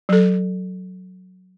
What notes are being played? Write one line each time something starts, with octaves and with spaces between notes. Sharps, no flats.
F#3 A4